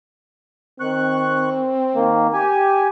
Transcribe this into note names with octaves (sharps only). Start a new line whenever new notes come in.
D#3 C4 C#6 F#6
D#3 A#3
G4 G#5